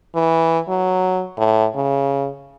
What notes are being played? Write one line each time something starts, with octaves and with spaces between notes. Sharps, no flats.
E3
F#3
A2
C#3